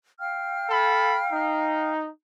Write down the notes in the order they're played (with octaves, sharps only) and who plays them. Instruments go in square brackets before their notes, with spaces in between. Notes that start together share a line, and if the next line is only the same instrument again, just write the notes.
[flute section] F5 G5 F6
[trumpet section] A4 B5
D#4